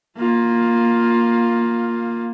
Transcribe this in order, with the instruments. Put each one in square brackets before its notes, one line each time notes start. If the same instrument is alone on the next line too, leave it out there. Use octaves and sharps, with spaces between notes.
[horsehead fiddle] A#3 F4